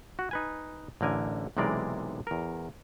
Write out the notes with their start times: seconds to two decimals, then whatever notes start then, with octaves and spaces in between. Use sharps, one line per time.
0.19 F#4
0.31 D#4 B4 G#5
1.01 A1 D3 A#4 G#5
1.57 B1 C3 E3 G#3 A#4 D5
2.27 E2 A#4